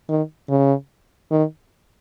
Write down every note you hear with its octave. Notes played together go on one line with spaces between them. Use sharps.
D#3
C#3
D#3